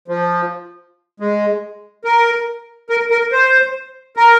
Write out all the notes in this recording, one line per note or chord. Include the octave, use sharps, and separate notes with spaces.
F3
G#3
A#4
A#4
A#4
C5
A#4